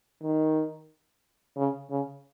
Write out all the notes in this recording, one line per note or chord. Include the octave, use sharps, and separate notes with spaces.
D#3
C#3
C#3